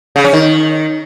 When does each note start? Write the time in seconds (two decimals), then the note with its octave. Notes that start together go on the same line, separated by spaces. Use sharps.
0.16 C#3
0.24 C#4
0.33 D#3